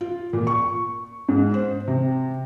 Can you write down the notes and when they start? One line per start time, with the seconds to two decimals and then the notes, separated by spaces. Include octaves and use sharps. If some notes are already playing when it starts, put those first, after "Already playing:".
0.01 F4
0.33 A#2
0.47 C#6
1.29 G#2
1.54 C5
1.88 C3